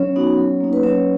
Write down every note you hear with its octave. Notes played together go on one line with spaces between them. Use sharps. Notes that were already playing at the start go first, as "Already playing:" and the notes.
Already playing: F#3 C#4 C#5
B3 D#4 F#4
F#3
A#3 D#4
B4
F#3 C#4 C#5